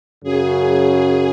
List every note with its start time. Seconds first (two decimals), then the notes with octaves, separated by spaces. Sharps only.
0.23 F#2 C#3 F#3 G#4